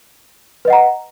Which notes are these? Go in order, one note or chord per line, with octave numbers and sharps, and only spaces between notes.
B4 D#5 F#5 A#5